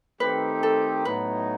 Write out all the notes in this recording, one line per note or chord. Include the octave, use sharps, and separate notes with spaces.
D#3 A3 C4 D#4 G4 B4
A4
A2 F#3 B3 D#4 B4